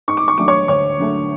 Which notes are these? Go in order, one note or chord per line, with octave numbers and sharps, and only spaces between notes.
G#2 C#6
D6
C#6
F#3 A3 D4 D6
C#5 C#6
D2 C#5 C#6
D3 F#3 A3